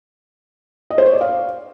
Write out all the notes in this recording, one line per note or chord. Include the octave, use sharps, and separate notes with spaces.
D#5
C5
C#5
D5
F5